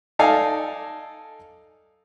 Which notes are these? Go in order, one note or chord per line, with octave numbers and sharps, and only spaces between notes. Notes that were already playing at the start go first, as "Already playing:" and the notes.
D#4 A4 D5 F5 G#5